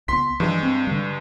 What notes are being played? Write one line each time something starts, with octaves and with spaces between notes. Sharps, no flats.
C#2 B3 C6 B6
G2 E3 F3 G#3
C4
D3 G3